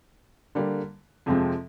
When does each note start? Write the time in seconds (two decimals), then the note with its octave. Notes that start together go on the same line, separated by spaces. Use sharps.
0.55 D3 G3 A#3
1.26 F2 C3 F3 G#3 C4